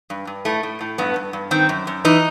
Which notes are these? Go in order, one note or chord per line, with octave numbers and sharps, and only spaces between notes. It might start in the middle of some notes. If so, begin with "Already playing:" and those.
G2
G2
A2 A3
A2
A2
G2 B3
G2
G2
D#3 C4
F#2
F#2
E3 D#4